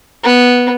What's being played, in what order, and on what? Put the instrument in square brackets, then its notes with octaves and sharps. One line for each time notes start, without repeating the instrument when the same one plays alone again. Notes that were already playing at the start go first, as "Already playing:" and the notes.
[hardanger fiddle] B3